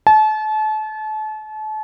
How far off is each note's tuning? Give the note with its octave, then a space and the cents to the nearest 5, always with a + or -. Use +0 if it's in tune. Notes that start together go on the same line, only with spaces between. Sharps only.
A5 -35